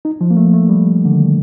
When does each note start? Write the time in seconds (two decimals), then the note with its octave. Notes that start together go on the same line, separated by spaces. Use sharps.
0.05 D#4
0.21 F3
0.30 A#3
0.37 A3
0.54 A3
0.69 G3
1.05 D3
1.11 D#3